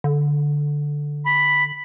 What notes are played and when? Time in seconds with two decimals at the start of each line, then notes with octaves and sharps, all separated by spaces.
0.04 D3
1.25 B5